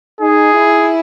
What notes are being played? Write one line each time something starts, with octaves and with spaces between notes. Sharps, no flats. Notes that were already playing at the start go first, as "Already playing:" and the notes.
D#4 G#4
E4